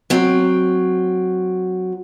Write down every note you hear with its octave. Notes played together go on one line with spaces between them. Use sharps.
F#3 C4